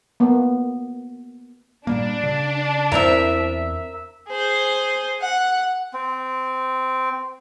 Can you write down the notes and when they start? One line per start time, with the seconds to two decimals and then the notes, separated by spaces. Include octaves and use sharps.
0.20 A#3 B3
1.87 A#2 G3 A#3 D4
2.23 C#3
2.92 E2 C4 E4 A#4 E5
4.29 G#4 C5
5.21 F#5
5.93 C4